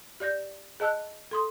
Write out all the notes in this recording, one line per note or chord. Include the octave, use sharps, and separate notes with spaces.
G4 D5 G6 A#6
G#4 D#5 A5 E6 F#6
A4 C6 D#6